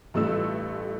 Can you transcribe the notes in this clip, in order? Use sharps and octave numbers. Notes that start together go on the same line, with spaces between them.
A1 G2 A3 F4 E6